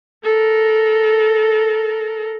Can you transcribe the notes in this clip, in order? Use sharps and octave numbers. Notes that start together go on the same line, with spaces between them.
A4 A#4